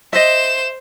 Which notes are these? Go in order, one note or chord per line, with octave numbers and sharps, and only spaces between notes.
C5 D#5 E5 E7